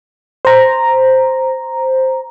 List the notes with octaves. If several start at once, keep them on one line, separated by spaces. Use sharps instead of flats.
C5 A#5